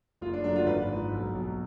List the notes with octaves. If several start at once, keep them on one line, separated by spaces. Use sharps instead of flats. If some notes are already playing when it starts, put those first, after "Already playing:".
F#1 F4
D4
F#2 D3 F#3 A3 D4
F4
G#1 B4
G#2 F3
B1
B2 F#3